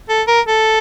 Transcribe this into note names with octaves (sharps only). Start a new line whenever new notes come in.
A4
A#4
A4